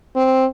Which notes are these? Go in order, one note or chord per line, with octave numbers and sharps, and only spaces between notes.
C4